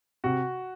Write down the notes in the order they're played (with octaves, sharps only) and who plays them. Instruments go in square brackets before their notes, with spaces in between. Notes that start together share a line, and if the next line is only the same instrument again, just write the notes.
[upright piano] C3 [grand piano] F#4